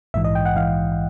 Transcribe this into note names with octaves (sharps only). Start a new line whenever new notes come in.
A#1 G#2 E3 E5
D#5
G5
F#5
A#1 G#2 E3 F5